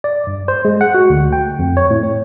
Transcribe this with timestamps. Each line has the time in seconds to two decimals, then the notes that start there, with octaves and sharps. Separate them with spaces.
0.04 D5
0.27 G2
0.48 C5
0.65 G#3
0.81 F#5
0.94 F#4
1.10 D2
1.33 G5
1.59 F2
1.77 C#5
1.91 A2
2.03 C#5